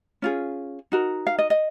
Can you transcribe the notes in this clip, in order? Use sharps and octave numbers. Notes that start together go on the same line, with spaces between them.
C#4 F4 G#4
D#4 F#4 A#4
F5
D#5
D#5